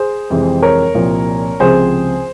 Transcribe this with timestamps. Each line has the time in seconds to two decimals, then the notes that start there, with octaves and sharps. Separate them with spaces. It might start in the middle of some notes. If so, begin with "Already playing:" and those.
Already playing: G#4 C5
0.30 F2 C3 E3 G#3 C4
0.63 A#4 C#5
0.95 C2 A#2 F3 A#3
1.60 C#2 C3 F3 C4 G#4 C5